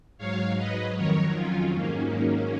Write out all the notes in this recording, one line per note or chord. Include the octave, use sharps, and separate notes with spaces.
G#2 F#3 C#5 F5
B4 D#5
F2 D#3 F#3 A#4 C#5
C#4 F4
G#2 D#3 F#3 A#3 C#4